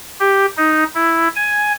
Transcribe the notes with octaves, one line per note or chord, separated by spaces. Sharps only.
G4
D#4
E4
G#5